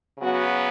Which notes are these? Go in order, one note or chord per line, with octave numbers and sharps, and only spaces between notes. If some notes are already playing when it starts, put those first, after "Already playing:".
C#3 F#3 B3 F#4